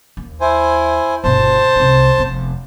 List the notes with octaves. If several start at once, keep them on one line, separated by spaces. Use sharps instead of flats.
D#2
E4 C5 G#5
G1 B2 C5 A5
C2 D#4
F1 B3